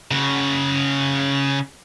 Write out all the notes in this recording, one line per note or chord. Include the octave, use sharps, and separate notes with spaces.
C#3 F#4